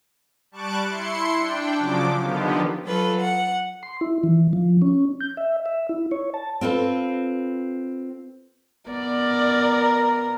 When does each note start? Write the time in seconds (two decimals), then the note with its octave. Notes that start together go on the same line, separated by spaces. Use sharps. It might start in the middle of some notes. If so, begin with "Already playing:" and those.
0.51 G3 A5 C#6 F#6 D7
0.87 E4 C6 C#7
1.37 D4 G5
1.76 C#3 F3 F#3 D6
2.20 D3 D#3 F3 B3 G4
2.85 F#3 F4 A4 B4
3.19 F#5
3.83 C6
4.01 E4
4.23 E3
4.53 F3
4.82 C#4
5.20 G6
5.37 E5
5.66 E5
5.89 E4
6.11 C#5
6.34 A5
6.61 C4 F4 A4 B4
8.90 B3 A#4 D5